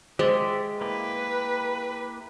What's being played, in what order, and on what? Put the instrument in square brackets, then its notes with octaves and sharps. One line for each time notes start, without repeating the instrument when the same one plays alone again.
[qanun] G#3 [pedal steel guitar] G4 D5 E5 [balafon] C5
[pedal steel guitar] A#3 E4 G4 [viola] B4